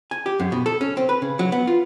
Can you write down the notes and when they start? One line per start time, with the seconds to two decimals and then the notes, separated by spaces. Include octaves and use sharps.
0.11 G#5
0.26 G4
0.40 F#2
0.52 B2
0.66 A4
0.81 C#4
0.97 C4
1.09 B4
1.22 C#3
1.39 F#3
1.52 B3
1.67 F4